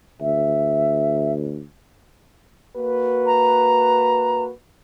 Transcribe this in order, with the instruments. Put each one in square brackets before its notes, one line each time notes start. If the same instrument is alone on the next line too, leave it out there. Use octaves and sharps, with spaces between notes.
[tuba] D2 [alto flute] E5
[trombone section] A#3 F#4 B4
[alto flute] A#5